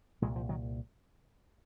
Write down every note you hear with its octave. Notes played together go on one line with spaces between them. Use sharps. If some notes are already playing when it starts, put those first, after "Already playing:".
C2 A#2 F3 G#3
F3
D#3 F#3